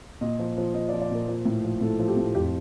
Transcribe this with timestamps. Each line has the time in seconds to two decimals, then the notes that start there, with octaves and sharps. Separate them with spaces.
0.21 A#2 D#5
0.39 F3
0.58 F3
0.74 F3 D#5
0.89 D5
0.93 F3
1.02 D5
1.11 A#2 A#4
1.28 F3
1.45 A2
1.64 F3
1.81 A2 A4
1.99 F3
2.08 G4
2.17 A2
2.35 F2 G4